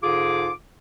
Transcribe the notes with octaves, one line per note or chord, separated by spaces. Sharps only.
G#2 D3 F4 G#4 D6